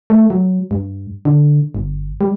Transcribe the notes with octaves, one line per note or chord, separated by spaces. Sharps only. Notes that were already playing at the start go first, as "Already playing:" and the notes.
A3
F#3
G2
D3
G1
G3